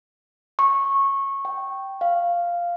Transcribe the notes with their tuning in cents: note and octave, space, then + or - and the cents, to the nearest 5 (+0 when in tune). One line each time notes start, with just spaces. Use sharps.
C#6 -15
G5 -10
F5 -5